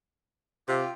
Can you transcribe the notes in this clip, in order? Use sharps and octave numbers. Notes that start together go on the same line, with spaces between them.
C3 F4 G4